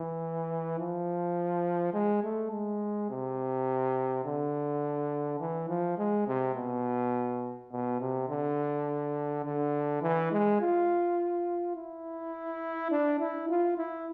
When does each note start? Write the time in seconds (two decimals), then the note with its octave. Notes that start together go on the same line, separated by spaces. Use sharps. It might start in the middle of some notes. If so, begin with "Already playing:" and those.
Already playing: E3
0.79 F3
1.93 G#3
2.23 A3
2.52 G#3
3.10 C3
4.25 D3
5.40 E3
5.69 F3
5.98 G#3
6.27 C3
6.55 B2
7.72 B2
8.00 C3
8.29 D3
9.45 D3
10.02 E3
10.32 G#3
10.61 F4
11.75 E4
12.91 D4
13.19 E4
13.49 F4
13.77 E4